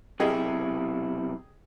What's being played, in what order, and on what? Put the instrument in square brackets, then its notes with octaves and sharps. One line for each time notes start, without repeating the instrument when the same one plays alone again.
[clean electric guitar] B1 C3 E4 [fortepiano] G4 G#4 D#5